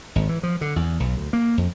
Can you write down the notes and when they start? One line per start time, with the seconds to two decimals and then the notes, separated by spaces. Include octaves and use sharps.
0.15 G#1
0.29 E3
0.43 F3
0.61 D3
0.76 E2
1.00 B1
1.17 D2
1.33 A#3
1.57 F2